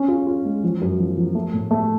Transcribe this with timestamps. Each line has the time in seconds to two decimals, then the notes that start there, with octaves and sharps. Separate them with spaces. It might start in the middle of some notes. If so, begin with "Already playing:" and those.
Already playing: C#4
0.08 F4
0.27 F4
0.45 G#3
0.63 F3
0.81 F#2
0.99 F3
1.17 F3
1.35 A3
1.54 A2
1.71 A3